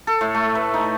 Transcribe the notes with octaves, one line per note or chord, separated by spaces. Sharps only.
A4
A2
A3
B4
D#4